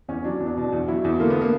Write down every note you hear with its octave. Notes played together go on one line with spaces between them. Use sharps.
E2 C#4
F#3 D4
E2
D4
B2
E2
F#3 E4
E2
D3 A#3
B3
A#3